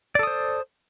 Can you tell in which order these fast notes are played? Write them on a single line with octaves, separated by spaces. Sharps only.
D5 A4 D#6 C5